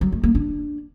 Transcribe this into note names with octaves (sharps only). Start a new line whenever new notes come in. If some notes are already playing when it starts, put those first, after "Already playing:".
F#3
A3
A#3
D4